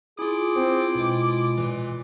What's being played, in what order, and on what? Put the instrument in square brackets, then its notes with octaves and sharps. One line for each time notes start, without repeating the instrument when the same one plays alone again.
[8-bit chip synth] E4 F4 [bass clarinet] G#4 [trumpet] D6
[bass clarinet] C4 [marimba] C5
[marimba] B2 [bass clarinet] G#3
[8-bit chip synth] A#2 E3